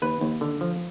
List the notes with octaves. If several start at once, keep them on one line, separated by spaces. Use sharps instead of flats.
D#2 B4
D#2
D3
F3